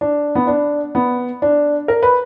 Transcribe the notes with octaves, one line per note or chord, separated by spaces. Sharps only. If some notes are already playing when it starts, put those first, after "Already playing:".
D4
B3
D4
B3
D4
A#4
B4